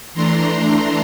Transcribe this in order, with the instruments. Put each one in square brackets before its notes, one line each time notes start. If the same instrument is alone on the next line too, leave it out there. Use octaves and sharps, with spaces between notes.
[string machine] E3 A3 D4 A#5 C6